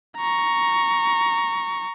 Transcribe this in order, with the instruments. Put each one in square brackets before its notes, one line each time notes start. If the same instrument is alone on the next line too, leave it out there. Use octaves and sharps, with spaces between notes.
[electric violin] A#5 C#6